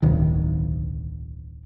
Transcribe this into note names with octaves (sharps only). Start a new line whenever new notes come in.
D1 B1 D#3